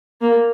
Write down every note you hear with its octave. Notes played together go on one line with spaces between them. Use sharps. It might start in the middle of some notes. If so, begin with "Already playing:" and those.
A#3